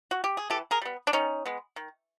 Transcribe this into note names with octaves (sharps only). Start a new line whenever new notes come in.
F#4
G4
G#4
E3 G4 A4
G#4 A#4
G3 B3
D4
D#3 C#4 D#4
G#3 B3
D#3